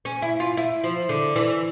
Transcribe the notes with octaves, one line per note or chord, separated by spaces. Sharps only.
C#4
E4
F4
E4
F3
D3
E3